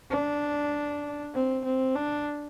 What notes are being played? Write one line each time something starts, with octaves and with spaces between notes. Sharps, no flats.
D4
C4
C4
D4